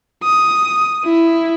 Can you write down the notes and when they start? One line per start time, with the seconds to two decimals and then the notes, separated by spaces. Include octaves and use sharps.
0.24 D#6
1.05 E4